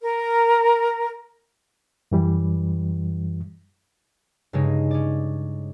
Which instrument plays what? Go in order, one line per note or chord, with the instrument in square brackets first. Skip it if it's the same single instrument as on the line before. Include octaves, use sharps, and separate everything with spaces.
[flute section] A#4
[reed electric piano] F#2 E3 G3
[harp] G2 C#3 G#3 D#4
C#4 D5